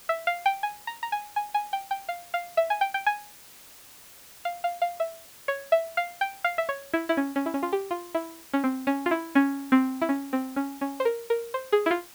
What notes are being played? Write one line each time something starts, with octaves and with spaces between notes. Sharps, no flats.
E5
F5
G5
G#5
A#5
A#5
G#5
G#5
G#5
G5
G5
F5
F5
E5
G#5
G5
G5
G#5
F5
F5
F5
E5
C#5
E5
F5
G5
F5
E5
C#5
E4
E4
C#4
C#4
E4
C#4
F4
G4
F4
E4
C#4
C4
C#4
F4
E4
C#4
C4
E4
C#4
C4
C#4
C#4
C5
A#4
A#4
C5
G#4
E4
F4